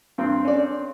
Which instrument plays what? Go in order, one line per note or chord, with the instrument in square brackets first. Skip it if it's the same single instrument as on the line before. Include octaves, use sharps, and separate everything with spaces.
[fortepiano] G2 C4
[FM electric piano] C#4 [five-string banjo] A4 D5